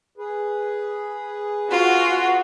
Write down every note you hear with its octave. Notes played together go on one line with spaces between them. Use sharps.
G#4 B4
F4 F#4